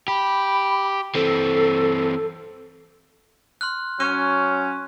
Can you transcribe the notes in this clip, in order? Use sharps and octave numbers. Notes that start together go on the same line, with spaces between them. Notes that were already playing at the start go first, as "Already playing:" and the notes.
G4 B5
E3 C4 A4
C6 F6 F#6
F#3 C#4 C#6 F#6 D#7